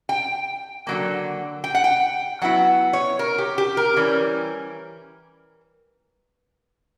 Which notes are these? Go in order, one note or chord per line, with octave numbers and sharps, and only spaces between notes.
G5
D3 F#3 A#3
G5
F#5
G5
F#3 B3 E4 F#5
C#5
A#4
G4
G4
A#4
E3 G3 C#4